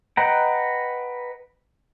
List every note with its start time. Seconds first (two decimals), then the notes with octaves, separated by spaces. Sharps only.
0.17 B4 D#5 F#5 G5 A#5